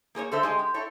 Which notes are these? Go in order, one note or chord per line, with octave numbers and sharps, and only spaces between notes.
A#3 G#4 C5 C#5
D3 A4 C5 E5
G#3 G4 D#5
G4
E4 A4 C#5